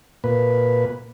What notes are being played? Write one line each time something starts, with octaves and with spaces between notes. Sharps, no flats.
A#2 B4